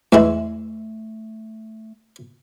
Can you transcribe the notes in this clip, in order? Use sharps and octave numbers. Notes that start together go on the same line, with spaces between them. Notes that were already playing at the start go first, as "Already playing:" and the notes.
E2 G#3 A3 E4